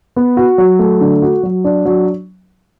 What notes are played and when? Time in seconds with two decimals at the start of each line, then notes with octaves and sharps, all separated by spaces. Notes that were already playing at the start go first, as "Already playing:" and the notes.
0.16 B3
0.37 F#4
0.58 F#3
0.79 A3
1.01 D3
1.22 F#4
1.43 F#3
1.64 D4
1.85 F#3